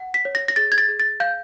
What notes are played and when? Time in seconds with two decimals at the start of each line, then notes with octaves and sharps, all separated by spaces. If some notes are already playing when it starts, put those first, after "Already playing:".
Already playing: F#5
0.14 B6
0.25 C#5
0.35 A#6
0.48 A#6
0.56 G#4 A6
0.72 G#6
0.78 A6
0.88 G#4
1.00 A6
1.20 F5 G6